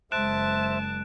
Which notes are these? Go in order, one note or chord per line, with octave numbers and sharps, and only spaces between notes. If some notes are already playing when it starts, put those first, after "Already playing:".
F#1 G#3 C5 E5 A5 F#6 D7 E7